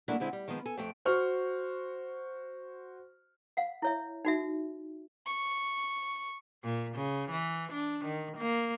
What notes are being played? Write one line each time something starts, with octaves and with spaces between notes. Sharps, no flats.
F#3 A3 A#3 D4 E4
D3 G#3 C4 E4
G3
D#3 F3 G#3 B3
A4 G#5
F2 A3 G5
F#4 C5 C#6 F6
F5 F#5
E4 C#5 E5
D#4 F#4 E5
C#6
A#2
C#3
E3
D4
D#3
A#3